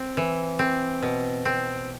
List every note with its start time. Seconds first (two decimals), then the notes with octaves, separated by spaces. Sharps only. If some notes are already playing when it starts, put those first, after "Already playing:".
Already playing: C4
0.17 E3
0.59 C4
1.02 B2
1.45 C4